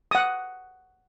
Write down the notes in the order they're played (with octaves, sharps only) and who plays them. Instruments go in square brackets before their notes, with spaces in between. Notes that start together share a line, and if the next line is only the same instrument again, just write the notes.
[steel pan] F#5 D#6